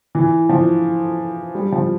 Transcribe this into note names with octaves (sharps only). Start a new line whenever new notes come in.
E3
F3
G3
F3